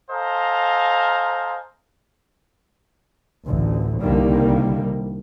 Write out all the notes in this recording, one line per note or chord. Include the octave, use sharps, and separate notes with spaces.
A4 C5 D#5 F5 G#5 A#5
A1 D2
C2 D3 D#3 G3 A#3